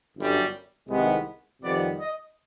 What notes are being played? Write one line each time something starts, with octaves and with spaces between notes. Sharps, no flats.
G1 F#2 D3 G3
C2 C3 D#3 G#3 B3
F2 C3 D#3 G3 B3 D5
D#5